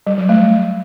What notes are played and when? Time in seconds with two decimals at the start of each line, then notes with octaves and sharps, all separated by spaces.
0.07 G3
0.18 F#3
0.29 A3